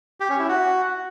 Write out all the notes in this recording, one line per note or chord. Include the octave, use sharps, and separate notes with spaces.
G4
C#4
E4
F#4